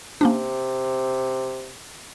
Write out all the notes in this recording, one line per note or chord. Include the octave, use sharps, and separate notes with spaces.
C3 A#3 C#4 D4